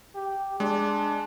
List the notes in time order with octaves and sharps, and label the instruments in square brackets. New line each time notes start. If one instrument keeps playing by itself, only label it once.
[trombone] G4
[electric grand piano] G#3 [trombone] D4